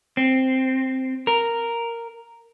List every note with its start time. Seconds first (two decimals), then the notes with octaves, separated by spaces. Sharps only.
0.17 C4
1.27 A#4